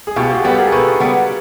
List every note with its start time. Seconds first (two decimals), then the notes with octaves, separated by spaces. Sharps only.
0.07 G#4
0.16 B2 F4 G4
0.30 F#4 G#4
0.44 G3 B3 G4 A4
0.58 G#4 A#4
0.72 B2 A4 B4
1.00 G3 B3